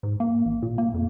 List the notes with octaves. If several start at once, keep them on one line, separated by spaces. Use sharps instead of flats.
G#2
A#3
A1
A#2
A#3
F2